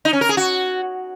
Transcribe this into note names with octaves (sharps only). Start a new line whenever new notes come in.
D#4
C#4
A#4
G#4
F#4